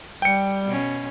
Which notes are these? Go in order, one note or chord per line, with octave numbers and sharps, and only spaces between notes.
G3 G5 C#7
B2 C#4